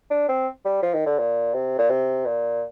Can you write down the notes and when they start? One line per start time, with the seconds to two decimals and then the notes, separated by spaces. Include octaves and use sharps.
0.11 D4
0.29 C4
0.65 G3
0.83 F3
0.94 D#3
1.06 D3
1.18 A#2
1.54 C3
1.79 A#2
1.90 C3
2.26 A#2